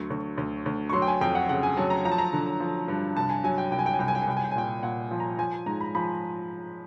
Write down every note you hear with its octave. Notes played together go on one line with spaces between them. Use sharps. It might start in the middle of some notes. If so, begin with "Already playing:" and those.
Already playing: D2 F#3 C#6
D2
D2
D2
C#6
F#3 C6
G5
G#5
F2 G5
F#5
C#3 F#5
G#5
F#3 A5
A#5
F3 A#5
A5
A#5
D3
F3
G2
C2 A5
G#5
F#3 G#5
G5
C2 G5
G#5
G5
G#5
C2 G5
G#5
G5
G#5
C2 G5
G#5
G5
G#5
A#2 G5
A#2 F#5
F3
A#5
F3 G#5
G#2 A#5
B5
F3 B5